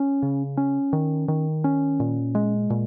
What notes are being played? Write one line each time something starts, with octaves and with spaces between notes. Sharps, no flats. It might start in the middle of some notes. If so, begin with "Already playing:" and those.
Already playing: C#4
C#3
C#4
D#3
D#3
C#4
A#2
G#3
A#2